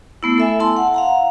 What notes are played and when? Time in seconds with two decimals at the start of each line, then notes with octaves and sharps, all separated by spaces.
0.23 A3 B3 E4
0.38 A4 E5 G#5
0.60 E4 A5 C6
0.77 F#5
0.94 F5 F#5 A#5